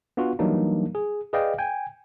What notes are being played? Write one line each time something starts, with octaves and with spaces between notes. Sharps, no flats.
B3 D4 F4 F#4
E3 F#3 G3 A#3 D4 D#4
G#4
G#4 B4 D5 D#5 F5 G5
G5 G#5